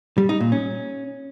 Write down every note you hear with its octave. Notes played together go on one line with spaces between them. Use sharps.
G3
D#4
A#2
C#4